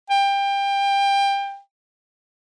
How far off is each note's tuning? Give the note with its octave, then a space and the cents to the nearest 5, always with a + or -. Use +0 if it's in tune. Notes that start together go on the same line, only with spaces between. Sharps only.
G5 +25